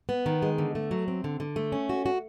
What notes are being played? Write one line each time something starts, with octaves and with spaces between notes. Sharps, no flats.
B3
D#3
G#3
D3
A3
F#3
C4
D3
D3
A3
C#4
F#4
F#4